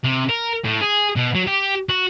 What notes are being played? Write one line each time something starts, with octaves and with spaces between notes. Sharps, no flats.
C3
A#4
A2
G#4
B2
F#3
G4
F#4